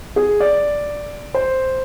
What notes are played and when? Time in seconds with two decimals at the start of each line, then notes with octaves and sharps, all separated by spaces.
0.16 G#4
0.40 D5
1.34 C5